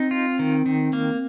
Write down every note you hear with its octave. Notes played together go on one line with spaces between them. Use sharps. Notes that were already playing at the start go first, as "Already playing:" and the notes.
Already playing: C4 D#4
F4
D#3
D#3
A#3